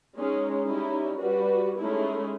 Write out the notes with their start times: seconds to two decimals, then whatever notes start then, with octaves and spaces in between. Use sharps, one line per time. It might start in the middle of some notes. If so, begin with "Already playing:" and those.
0.17 G#3 C#4 D#4
0.64 G3 C#4 D#4 E4
1.18 G3 F#4 B4
1.77 G#3 A3 C#4 D#4 E4